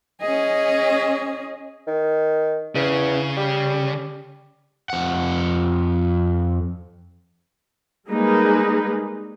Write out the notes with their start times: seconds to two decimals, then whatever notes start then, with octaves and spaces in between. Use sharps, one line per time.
0.21 C#4 G#4 D#5
1.87 D#3
2.75 E2 C#3
3.37 G3
4.90 F2 F#5
8.08 G3 G#3 A#3 D#4 G#4 B4